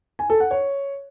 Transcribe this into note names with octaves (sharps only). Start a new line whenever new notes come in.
G#5
A4
F#5
C#5